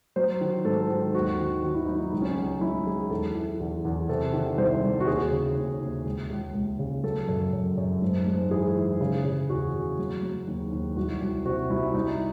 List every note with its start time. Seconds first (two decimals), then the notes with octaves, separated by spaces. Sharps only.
0.16 F#3 C5
0.41 D#3
0.65 G#2 A4
0.90 D#3
1.14 D#2 F#4
1.39 D#3
1.63 D#3 F#4
1.74 E4
1.86 F#3 D#4
1.96 E4
2.12 C#2 D#4
2.22 C#4
2.31 D#4
2.37 C#2
2.61 F#3 E4
2.86 F#3 G#4
3.10 E2 A4
3.35 E3
3.60 E2
3.85 E2
4.09 C3 A4
4.34 D#3
4.58 C2 C5
4.83 C2
5.00 F#4
5.07 D#2 G#4
5.32 C#3
5.56 D#2
5.81 D#2
6.05 C#2
6.30 C#2
6.54 C#2
6.79 C#3
7.04 F#3 A4
7.28 F#2 A4
7.53 F#2
7.77 F#2
8.02 G#2
8.26 G#2
8.51 E3 G#4
8.76 E3
9.01 C#3
9.24 C#3
9.50 E2 F#4
9.74 C#3
9.99 F#3
10.23 F#3
10.47 D#2
10.72 D#2
10.96 C2 F#4
11.21 C2
11.45 C3 F#4
11.70 C2 E4
11.94 C2 D#4